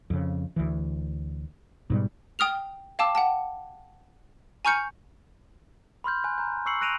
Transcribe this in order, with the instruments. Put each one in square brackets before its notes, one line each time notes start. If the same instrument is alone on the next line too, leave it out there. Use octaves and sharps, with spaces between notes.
[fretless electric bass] F2 C#3
D2 E3
G#2 B2 G3
[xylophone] G5 D#6 F6 F7
F5 G5 A5 D6 E6
F#5 G5 A5
G#5 A#5 C#6 F6 G6 C#7
[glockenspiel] B5 C6 F6 G6
G#5 F#6 G6
A#5 G6
C#6 E6 C7 C#7 F#7
F#6 A#6 D7 D#7 F7